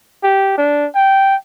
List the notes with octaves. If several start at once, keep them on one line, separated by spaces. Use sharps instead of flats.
G4
D4
G5